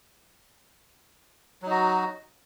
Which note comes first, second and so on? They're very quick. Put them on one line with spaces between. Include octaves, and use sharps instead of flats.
F#3 D#4 F#4